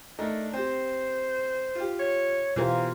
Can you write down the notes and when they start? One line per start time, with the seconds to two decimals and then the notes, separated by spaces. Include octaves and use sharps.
0.19 A3 D4 D#4 A#4
0.53 C4 G4 C5
1.75 F4 G4
1.99 C#5
2.56 B2 E3 F4 G4 A#4 C5